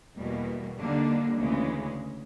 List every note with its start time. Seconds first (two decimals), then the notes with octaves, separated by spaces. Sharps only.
0.16 E2 B2 G3 A#3
0.77 D#2 D3 G3 A#3 D4
1.37 D2 C#3 E3 G#3